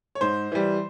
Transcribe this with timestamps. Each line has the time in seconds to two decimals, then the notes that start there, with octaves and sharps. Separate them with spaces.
0.15 C#5
0.21 G#2 C5
0.52 E3 G3